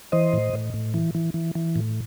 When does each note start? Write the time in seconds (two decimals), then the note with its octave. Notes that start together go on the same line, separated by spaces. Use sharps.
0.12 E3 C5 D#5
0.33 A2
0.54 A2
0.74 A2
0.94 E3
1.15 E3
1.34 E3
1.55 E3
1.76 A2